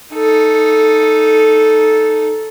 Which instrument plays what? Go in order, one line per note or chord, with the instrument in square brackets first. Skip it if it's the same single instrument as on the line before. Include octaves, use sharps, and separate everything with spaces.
[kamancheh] D#4 A4